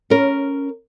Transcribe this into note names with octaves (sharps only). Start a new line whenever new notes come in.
C#4 A#4